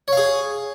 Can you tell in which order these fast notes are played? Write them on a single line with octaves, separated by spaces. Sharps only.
C#5 F5 G#4